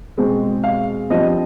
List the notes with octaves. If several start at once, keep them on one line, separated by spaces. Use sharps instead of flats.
B2 G#3 C4
F5
G2 F3 C4 D#5